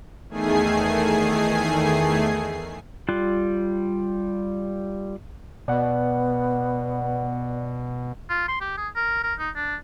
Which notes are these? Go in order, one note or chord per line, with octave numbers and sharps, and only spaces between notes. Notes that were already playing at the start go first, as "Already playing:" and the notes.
E2 D#3 A3 G#4 G#5 C7
G3 F4 F#6
B2 B3 D5 F#5
F4
C6
G4
G#4
A#4
A#4
D#4
D4